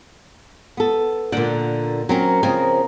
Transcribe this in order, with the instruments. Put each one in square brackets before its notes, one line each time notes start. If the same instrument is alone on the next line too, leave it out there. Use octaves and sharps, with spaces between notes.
[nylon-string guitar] B3 A4
[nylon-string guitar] A#2 D3 [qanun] A#3 F#5 G5
[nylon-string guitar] F#3 C4 C#4 [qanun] A#4
[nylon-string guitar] C#3 F3 C4 [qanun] A#4 D#5 G#5